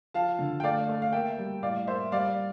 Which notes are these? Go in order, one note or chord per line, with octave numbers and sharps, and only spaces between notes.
F3 F5 A5
D3
G5
A3 D5 F5
A3
F5
A#3 E5 G5
G3
A2 D5 F5
A#3 C5 E5
G3 D5 F5